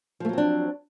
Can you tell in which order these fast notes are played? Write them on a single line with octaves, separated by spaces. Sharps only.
F3 A3 F#3 C4 D4